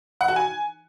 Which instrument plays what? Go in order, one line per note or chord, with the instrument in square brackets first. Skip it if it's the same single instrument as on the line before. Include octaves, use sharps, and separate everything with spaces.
[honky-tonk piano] F#5
F#4
G#5